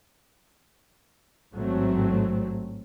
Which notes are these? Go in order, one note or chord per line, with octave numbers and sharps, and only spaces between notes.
A1 G#2 F#3 A3 C4